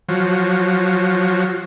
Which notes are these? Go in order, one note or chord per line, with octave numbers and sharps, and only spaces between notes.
F3 F#3